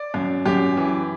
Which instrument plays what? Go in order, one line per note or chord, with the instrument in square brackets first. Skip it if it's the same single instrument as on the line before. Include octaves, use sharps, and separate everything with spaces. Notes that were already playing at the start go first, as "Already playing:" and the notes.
Already playing: [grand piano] D5
F#2
F#2 G4
E3